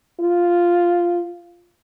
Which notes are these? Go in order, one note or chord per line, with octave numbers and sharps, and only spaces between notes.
F4